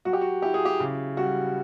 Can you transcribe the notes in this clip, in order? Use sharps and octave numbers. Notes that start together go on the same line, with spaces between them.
F#3 F#4
G4
F#4
E4 G4
G#4
G4
C#3
G3 F#4